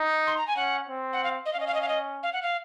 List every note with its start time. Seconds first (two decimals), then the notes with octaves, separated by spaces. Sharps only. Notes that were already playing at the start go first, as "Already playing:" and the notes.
Already playing: D#4
0.27 C6
0.37 A#5
0.47 G#5
0.56 C#4 F#5
0.90 C4
1.13 F#5
1.24 F5
1.45 D#5
1.53 F5
1.57 C#4 D#5
1.67 F5
1.74 D#5
1.82 F5
1.88 D#5
2.23 F5
2.33 F#5
2.42 F5